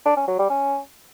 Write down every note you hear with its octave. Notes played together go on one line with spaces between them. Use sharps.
D4
C#4
F#3
G3
C#4